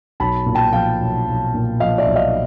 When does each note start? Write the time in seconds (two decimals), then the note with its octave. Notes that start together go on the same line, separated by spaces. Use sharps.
0.20 B1 A5 B5
0.46 A#2
0.55 G5 A5
0.73 F3 F5 G5
1.00 B1
1.27 B1
1.54 A#2
1.80 F3 D#5 F5
1.98 D5 E5
2.07 B1
2.16 D#5 F5